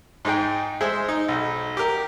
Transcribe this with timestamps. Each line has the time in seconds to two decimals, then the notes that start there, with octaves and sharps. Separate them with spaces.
0.25 G#2 D#4 G#4 G5
0.81 G#3 G#4 C5 E5
1.09 D#4
1.28 B1
1.77 G4 A#4